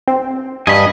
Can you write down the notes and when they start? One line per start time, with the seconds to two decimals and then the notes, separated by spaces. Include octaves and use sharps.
0.08 C4
0.67 G2 D#5 G#5 B5